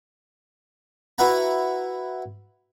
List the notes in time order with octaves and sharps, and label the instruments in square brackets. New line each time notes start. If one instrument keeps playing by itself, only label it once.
[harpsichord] E4 F#4 B4 F#5 A#5